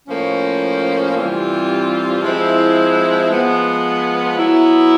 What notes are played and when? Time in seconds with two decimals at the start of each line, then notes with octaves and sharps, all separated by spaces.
0.07 A2 F3 A#3 C#4
1.15 C3 E3 G3 C4 F4
2.22 F3 G#3 C4 E4
3.29 F3 G#3 B3
4.36 F#3 B3 E4